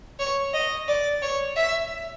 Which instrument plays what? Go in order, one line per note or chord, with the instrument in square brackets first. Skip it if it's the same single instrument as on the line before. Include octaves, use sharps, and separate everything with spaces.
[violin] C#5
D#5
D5
C#5
E5